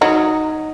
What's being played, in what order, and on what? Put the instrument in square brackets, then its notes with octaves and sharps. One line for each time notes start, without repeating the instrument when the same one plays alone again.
[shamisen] F#3 [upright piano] D#4